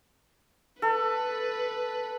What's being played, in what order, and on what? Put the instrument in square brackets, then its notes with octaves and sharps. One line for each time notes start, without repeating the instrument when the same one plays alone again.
[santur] A4 [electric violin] B4